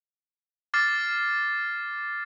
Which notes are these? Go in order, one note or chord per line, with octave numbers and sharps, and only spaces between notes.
D6 F6 A6 C7